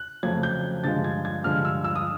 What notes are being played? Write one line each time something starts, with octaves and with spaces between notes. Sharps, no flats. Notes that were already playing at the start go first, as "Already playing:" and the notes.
Already playing: F#6
F2 C#3 F#3 A3 G#6
G6
G2 D3 F3 G#3 A6
G#6
G#6
G2 D3 F3 G#3 F6
E6
E6
D#6